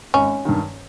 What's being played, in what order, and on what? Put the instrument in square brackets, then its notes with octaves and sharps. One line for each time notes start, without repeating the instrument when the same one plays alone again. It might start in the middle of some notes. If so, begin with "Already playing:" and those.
[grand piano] G#1 [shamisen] C#4
[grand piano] G2 D#3